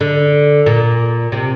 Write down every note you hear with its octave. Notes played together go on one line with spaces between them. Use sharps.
D3
A#2
C3